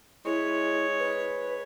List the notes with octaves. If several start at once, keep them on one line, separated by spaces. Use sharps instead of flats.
G#3 E4 C#5
B4